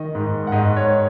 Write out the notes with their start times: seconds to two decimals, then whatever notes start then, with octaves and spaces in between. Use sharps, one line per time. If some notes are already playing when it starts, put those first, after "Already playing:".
Already playing: D#3 D#5
0.15 G#2
0.47 F#5
0.52 G#2 D#5
0.76 C#5